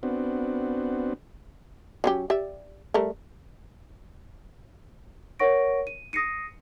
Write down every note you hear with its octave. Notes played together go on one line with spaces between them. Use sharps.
B3 C4 D4 F#4
F#3 C#4 G4
G4 D5 E5
G3 A3 A#4
A#4 C#5 F#5 C#6 A#6 D7
D#7
D#6 A#6 C7 C#7 D#7